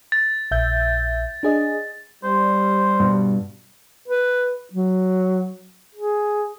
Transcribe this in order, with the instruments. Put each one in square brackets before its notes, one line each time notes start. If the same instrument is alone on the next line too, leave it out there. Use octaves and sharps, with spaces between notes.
[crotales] A6
[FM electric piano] A#1 E5 G6
D4 G#4 D#5
[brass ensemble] G3 [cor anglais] C5
[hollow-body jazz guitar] G2 B2
[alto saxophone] B4
F#3
G#4